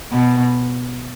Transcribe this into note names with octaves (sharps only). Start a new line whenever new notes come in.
B2